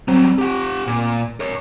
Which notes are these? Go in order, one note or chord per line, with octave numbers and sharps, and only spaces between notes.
F#3 G3 C4
G4 F#5
A#2
A#4 C#5